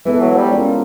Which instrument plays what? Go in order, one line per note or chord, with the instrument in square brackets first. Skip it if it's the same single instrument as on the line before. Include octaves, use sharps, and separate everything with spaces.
[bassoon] E3 [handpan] G#3 B3 E4 A4
[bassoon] F#3
G3
[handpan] G#3 C#4 F4 A#4